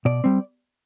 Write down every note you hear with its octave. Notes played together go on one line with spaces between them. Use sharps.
B2 D5
G3 C4